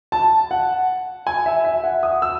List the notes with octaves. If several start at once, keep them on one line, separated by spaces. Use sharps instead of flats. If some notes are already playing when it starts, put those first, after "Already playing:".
A5
F#5
G#5
E5
E5
F#5
D#6
E6